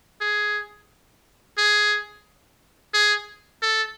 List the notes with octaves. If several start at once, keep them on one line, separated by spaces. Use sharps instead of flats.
G#4
G#4
G#4
A4